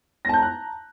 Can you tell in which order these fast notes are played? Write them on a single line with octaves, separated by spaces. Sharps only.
A#6 A5 G6 A#5 F#6